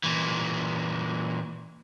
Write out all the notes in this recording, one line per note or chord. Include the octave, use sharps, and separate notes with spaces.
A#2 E3